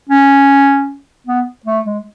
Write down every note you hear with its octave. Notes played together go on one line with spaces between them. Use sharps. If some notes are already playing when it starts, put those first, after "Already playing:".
C#4
B3
A3
G#3